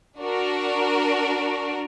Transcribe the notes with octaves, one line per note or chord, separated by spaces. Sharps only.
D4 F#4 A#4